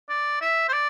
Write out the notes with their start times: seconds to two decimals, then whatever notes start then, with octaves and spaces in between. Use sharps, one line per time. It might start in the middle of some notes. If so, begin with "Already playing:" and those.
0.09 D5
0.41 E5
0.69 C5
0.73 D5